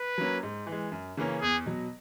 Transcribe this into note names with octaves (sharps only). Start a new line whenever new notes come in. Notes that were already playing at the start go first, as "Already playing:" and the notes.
Already playing: B4
F#3 A#3 C#4
G#2
E3
G#3
F#2
C#3 E3 A#3 C#4
E2 G#4
B2 F#3